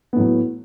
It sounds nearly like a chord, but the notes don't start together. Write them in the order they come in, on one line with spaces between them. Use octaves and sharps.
B3 A2 F#3